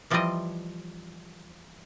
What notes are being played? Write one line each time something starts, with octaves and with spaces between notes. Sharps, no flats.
E3 F3 G3 C4 D5 D#5